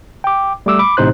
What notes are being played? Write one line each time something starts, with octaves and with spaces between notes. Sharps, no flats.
G5 D6
G3 A3 D6 E6
B5 D6
A1 A2 C3 D#4 C5 F#6